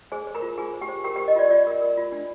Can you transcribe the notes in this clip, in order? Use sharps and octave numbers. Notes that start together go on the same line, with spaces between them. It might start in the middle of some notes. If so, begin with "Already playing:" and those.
G#4 C5 G#5
C5
A#4 A#5
F4
F4 G#4 G#5
C5
G4 G5
C5
G4 A#4 G5
G4 G5
A#4
D#5
F4 D5
F4 D5
A#4
A#4
F4
D4